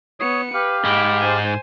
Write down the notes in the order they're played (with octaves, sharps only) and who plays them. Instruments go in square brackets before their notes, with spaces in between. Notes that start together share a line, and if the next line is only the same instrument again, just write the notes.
[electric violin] B3 C#7 [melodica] C#5 D#6
[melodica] G4 F5 [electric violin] B4
[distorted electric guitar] G#2 D#5 [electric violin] B5 D7
[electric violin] C5 G#5